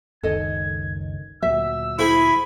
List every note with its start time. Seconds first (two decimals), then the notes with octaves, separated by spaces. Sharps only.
0.23 F#1 C#2 D#3 A4 D#5 G#6
1.42 D2 A#2 F#3 E5 E6
1.99 E4 G#4 C5 B5